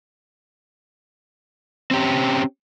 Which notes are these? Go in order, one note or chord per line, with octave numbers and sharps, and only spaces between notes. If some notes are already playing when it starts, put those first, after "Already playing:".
C4 C#4 G4